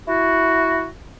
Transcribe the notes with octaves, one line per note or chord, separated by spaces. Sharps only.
E4 F#4